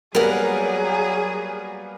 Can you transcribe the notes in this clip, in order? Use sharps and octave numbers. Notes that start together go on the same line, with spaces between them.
F#3 G3 A#3 B3 G#4 A#4 F#5